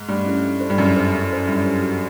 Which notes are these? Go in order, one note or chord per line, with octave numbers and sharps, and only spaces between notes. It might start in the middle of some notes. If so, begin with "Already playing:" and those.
Already playing: G#2
G2 A3
C#4 E4 A4
E4
A4 C5
G2
F#2 E4
A4 C5
E4
A4 C5
G2 E4
A4 C5
F#4